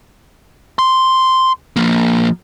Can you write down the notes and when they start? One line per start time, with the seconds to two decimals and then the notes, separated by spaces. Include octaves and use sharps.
0.79 C6
1.76 F3 A#3